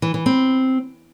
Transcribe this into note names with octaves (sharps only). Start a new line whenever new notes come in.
E3
E3
C4